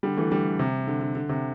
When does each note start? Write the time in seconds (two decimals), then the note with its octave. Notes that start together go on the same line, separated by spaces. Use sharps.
0.03 D3 G3
0.17 E3 A3
0.31 D3 G3
0.59 C3
0.87 D3
1.01 D3
1.15 D3
1.29 C3